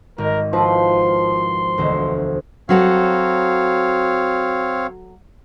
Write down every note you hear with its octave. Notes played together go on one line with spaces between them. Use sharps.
G#1 A#4
F3 E4 F#4 B4 C6
E1 D2 C5
F#3 C4 F#4 A4 C#5 F5